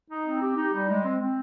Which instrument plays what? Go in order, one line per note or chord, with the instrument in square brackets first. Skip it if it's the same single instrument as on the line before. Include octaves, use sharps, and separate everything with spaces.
[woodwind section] D#4
C4
G4
D#4
G3
G#3
C4
C4